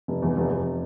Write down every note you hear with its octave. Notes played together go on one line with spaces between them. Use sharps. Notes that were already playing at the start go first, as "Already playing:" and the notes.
F1
E2
F1
F1